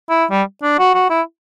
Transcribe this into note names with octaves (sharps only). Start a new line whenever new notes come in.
E4
G3
D4
F#4
F#4
E4